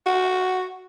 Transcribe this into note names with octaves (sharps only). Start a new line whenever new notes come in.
F#4